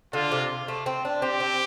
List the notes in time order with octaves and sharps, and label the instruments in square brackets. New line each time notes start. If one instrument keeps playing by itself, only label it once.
[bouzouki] D3 [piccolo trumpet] F4
[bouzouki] C3
A3
C4
D4
[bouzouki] C4 [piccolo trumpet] G4
[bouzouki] C4